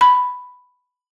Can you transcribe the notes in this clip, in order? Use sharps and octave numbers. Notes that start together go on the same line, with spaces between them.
B5